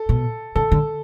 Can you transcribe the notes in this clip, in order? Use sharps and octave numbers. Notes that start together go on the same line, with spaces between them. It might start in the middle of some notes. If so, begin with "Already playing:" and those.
Already playing: A4
B2
C#3 A4
D3